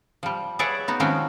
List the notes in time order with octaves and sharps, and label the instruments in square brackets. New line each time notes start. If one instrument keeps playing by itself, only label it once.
[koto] F3 G3
G#4 B4 C#5 D5 E5 F#5
B3 D#4 F#4
D#3 F3 G#3 C4 C#4 F#4